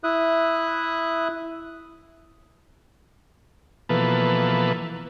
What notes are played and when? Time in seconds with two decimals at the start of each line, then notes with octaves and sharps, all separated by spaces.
0.04 E4 E5 D#6 F#6
3.89 B2 E3 F3 A#3 A4 B4